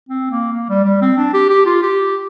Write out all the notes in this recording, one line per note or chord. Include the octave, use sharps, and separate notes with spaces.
C4
A#3
A#3
G3
G3
C4
D4
G4
G4
F4
G4